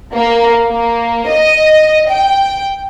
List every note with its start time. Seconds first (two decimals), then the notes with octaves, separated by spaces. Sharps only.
0.15 A#3
0.67 A#3
1.27 D#5
2.09 G5